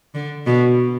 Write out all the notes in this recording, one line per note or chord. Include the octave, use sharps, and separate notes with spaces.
D3
B2